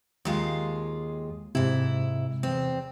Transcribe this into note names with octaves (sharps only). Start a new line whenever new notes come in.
D#2 G#3 F4
G#2 C3 E4
E2 C4